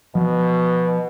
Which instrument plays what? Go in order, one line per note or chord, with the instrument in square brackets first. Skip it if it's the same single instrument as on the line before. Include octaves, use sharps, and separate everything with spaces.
[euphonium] B2 [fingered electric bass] F3